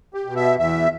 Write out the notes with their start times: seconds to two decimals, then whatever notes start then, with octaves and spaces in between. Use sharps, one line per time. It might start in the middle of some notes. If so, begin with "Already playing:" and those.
0.14 G4
0.25 B2
0.36 E5
0.58 E2 E5